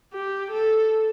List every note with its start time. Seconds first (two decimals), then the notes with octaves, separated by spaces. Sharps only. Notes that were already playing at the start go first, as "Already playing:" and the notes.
0.13 G4
0.51 A4